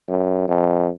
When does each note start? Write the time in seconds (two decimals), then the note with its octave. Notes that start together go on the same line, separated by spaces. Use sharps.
0.09 F#2
0.48 F2